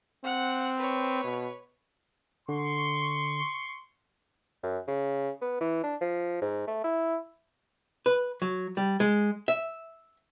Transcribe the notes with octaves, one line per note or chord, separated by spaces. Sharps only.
C4 F#5 F#6
B4 C#5
B2
D3 C6 C#6
F#2
C#3
B3
E3
D4
F3
G#2
A3
E4
B4
F#3
G3
G#3
E5